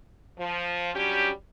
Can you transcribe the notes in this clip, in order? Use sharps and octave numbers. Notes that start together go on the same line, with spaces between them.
F3
F#3 G3 C#4 D4 G4